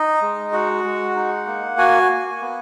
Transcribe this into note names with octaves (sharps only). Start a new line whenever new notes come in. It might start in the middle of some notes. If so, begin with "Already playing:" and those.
Already playing: D#4 D#5
G#3
F#4 F#5
G#3
D#4
A#3
F#4 G#5
A#3
B3